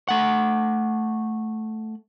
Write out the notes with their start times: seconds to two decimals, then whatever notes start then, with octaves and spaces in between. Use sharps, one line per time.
0.09 A3 F#5